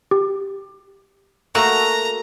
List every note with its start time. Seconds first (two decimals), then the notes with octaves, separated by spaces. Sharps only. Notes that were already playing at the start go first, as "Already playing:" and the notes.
0.11 G4
1.55 A3 A#3 F#4 A#5